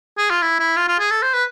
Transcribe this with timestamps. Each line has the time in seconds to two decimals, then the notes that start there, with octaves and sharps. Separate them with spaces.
0.18 G#4
0.30 F4
0.42 E4
0.59 E4
0.76 F4
0.88 F4
0.99 G#4
1.11 A4
1.22 C5
1.34 B4